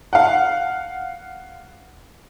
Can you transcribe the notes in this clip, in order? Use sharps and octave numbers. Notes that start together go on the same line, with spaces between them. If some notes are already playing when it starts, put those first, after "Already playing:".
F5 F#5